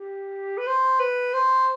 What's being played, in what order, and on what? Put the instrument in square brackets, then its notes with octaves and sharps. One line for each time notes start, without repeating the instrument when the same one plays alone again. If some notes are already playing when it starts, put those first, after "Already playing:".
Already playing: [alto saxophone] G4
B4
C5
B4
C5